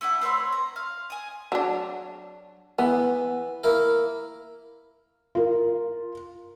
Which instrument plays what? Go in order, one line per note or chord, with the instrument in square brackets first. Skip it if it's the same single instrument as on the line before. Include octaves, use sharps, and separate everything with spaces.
[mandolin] A3 E4 A4 F#5
C4 B4 C#5 C6
A#5
F5
G#5 D#6
[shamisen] F#3 D4
[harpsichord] E3 [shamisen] B3
[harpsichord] A#3 E4 A#4
[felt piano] F4 A#4